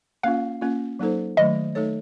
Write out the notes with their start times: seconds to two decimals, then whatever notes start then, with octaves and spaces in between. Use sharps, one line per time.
0.23 A#3 C#4 F4 F5
0.61 A#3 C#4 F4
0.99 F#3 A#3 D#4 A4 C5
1.37 D#3 F#3 A3 D#5
1.75 A3 D#4 A4 C#5